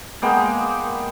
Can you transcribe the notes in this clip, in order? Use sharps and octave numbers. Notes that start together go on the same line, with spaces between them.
G#3 A#3 B3 G5